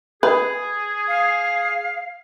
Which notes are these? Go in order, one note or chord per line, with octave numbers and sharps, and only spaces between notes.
G#4 B4
F5